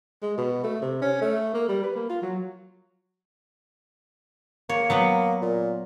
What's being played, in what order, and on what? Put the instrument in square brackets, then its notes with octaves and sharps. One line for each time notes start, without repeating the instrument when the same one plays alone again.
[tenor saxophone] G#3
B2
A3
C3
C#4
A3
A#3
G3
B4
A#3
F4
F#3
[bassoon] A#3 [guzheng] C#5
[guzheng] F#3 B3 B4
[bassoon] A#2